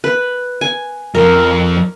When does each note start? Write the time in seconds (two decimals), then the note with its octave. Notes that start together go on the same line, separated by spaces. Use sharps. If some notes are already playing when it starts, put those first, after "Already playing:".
0.04 B4
0.61 G#5
1.15 F2 F3 A#4